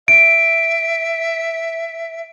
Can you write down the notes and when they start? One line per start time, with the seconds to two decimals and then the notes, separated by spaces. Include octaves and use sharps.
0.08 E5 D7